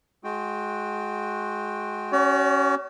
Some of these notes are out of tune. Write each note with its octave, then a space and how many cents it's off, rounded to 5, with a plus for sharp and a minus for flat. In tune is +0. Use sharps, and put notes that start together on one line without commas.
G#3 +20 F#4 -10 G5 +0
C#4 +0 F#4 +45 C#5 +45